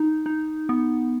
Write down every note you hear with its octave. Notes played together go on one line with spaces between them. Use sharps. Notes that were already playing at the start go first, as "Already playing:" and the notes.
Already playing: D#4
D#4
B3